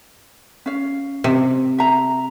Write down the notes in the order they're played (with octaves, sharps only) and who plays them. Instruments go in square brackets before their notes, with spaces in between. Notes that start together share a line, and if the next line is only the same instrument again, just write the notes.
[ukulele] C#4 F5
[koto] C3
[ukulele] E5 A#5